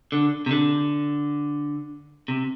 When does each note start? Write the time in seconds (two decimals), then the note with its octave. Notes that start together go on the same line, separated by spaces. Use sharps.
0.12 D3
0.46 C3
0.51 D3
2.28 C3